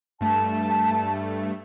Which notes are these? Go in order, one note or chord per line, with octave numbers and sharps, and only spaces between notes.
G2 A3 A5